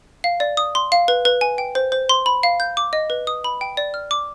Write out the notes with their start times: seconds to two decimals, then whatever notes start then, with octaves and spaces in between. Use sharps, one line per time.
0.24 F5
0.40 D5
0.57 D#6
0.75 C6
0.92 F5
1.08 B4
1.25 B4
1.41 G#5
1.58 G5
1.75 C5
1.92 C5
2.09 C6
2.26 B5
2.43 F5
2.60 G6
2.77 D6
2.93 D#5
3.10 B4
3.27 D#6
3.44 B5
3.61 G5
3.77 D5
3.94 F6
4.11 D6